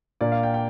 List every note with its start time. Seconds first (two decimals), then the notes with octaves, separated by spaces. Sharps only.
0.21 A#2 A#3 D4 D5
0.32 F5
0.43 G5
0.54 G5